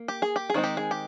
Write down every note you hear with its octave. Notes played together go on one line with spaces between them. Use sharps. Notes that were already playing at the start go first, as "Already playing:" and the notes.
Already playing: A#3
G4
G#4
G4
G#4
D#3 G#3 C4 D#4
G4
G#4
G4